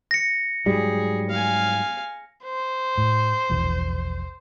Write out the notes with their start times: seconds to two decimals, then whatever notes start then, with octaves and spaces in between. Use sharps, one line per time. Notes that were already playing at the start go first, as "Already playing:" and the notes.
0.11 A#6 C#7
0.66 G#2 F#3 G3 G#4
1.30 F5 G#5
2.45 C5
2.98 A2
3.49 E1 A#1 E3